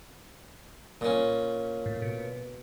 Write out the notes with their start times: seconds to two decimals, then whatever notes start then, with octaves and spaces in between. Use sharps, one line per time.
1.01 A#2 C#4
1.86 A2
2.02 B2